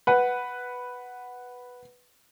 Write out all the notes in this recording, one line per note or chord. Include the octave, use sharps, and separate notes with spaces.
B4 F#5